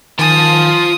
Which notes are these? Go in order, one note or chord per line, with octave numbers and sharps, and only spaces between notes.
D#3 F4 G#5 A5 D#6 A6